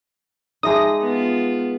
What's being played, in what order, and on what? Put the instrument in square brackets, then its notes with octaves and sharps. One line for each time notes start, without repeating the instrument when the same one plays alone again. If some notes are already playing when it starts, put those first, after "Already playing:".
[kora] G#3 D#4 [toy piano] G#4 E5 A5 [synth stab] D#6 A#6
[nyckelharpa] B3 F4